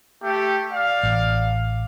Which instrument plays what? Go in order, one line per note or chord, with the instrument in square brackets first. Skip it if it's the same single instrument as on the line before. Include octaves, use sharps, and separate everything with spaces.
[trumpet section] A3 G4
D5 F5
[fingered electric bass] A1